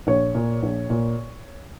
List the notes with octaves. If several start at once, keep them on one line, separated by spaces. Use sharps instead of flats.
A#1 C#5
A#2
A#1
A#2